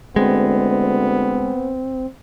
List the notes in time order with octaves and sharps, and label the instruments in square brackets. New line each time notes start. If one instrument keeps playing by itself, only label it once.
[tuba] D2 [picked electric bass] G#3 [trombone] B3 [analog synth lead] C4